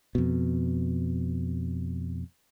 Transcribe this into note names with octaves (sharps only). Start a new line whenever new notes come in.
F2 B2